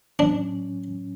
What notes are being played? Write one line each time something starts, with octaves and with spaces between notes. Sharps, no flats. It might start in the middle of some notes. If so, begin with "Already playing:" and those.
A2 F#3 C#4 D4